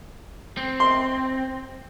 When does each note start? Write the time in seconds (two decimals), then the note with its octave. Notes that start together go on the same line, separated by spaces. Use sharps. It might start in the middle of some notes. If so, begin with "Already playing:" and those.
0.57 C4
0.80 C6